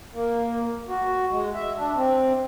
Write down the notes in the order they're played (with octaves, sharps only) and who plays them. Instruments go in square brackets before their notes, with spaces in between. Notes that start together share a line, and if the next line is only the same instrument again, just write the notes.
[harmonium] A#3
F#4
G#3
E5
D4
C4